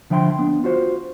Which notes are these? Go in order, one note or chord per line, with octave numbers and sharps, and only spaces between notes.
D3 F3 E5 G5 B5 C6
B3 D4
F4 F#4 C5